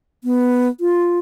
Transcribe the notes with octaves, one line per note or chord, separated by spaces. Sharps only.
B3
F4